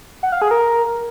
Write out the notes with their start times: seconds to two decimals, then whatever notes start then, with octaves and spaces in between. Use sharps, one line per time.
0.23 F#5
0.32 F5
0.42 G#4
0.51 A#4